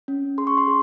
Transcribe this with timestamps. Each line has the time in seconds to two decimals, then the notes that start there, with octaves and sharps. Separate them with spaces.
0.08 C#4
0.38 G#4 C6
0.47 C#6
0.58 C6
0.68 G#4